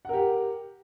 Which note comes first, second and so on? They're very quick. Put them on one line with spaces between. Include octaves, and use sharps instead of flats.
F#5 A#4 G4